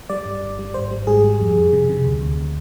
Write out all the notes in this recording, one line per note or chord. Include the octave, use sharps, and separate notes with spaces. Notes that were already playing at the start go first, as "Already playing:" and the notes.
G3 D5
G2
G1
G3
G#1 C5
G3
G#2 G#4
G3
F2
F2
C3
C3
D2
D2